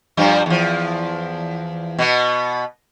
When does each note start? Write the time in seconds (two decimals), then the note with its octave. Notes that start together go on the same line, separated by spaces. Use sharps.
0.17 G2 F3 G3
0.46 E2 F3
1.99 B2 B3